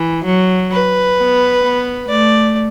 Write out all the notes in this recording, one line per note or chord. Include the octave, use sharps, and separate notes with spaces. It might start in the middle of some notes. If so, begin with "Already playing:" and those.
Already playing: E3
F#3
B4
B3
B3
A3 D5